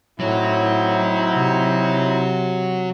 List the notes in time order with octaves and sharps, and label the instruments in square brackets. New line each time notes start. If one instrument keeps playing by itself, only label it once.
[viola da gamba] A2 [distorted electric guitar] F#3 [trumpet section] C4 D#4 E4
[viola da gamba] C3